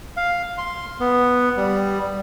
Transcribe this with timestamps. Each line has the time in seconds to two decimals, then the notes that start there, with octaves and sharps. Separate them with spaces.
0.17 F5
0.58 C6
1.00 B3
1.57 G3